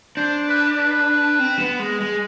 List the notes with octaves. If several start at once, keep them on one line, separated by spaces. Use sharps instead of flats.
D4 C5
B4
B4
C4
B3
G#3
G#3